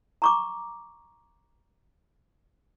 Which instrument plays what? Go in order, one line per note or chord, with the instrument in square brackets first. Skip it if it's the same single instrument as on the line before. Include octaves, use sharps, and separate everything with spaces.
[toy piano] A#5 C#6 D6